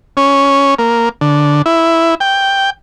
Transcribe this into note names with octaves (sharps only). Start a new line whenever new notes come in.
C#4
A#3
D3
E4
G5